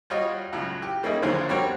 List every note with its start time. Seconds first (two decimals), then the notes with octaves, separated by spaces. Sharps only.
0.10 G3 F4 F#4 C#5 D#5
0.53 C#2 A2 F#3
0.82 G4
1.03 G3 A#3 C#4 D#4 E4 G#4
1.22 B1 F2 D3 F4 C5 C#5
1.49 G3 C4 F#4 G4 A#4 C#5